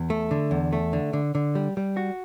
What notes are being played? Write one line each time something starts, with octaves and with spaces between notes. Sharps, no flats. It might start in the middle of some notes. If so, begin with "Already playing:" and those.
Already playing: E2
A3
D3
E2
A3
D3
D3
D3
G3
G3
F#4